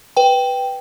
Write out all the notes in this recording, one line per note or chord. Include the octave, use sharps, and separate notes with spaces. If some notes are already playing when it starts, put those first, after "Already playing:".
B4 G5